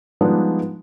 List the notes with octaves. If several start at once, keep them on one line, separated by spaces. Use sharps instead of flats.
F3 G3 G#3 B3 D4 D#4